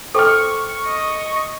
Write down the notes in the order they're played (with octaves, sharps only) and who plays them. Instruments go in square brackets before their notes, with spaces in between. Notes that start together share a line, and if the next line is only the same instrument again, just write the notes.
[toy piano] A4 G5 D6 [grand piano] C5 F6 [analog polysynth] C#6
[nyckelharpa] D#5